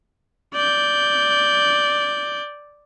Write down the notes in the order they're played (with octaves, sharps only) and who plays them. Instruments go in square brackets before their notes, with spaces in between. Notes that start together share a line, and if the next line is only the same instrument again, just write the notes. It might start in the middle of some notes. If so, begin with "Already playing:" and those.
[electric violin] D5 G6